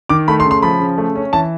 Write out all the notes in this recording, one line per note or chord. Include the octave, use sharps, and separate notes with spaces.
D#3 D6
A3 B5
C6
C#3
C6
F3 B5
C#3
A3
C#4
E3 A5